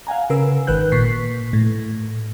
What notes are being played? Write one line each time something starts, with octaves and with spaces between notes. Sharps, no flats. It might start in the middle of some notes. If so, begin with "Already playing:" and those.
F5 F#5 G#5 A#5
C#3 A#4 B4 E6
G#1 D#3 B4 F#6 G6
A#2 C#6 B6 C7
A2